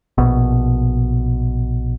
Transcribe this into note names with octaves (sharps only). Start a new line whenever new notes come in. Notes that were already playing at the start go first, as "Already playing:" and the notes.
A#1 B2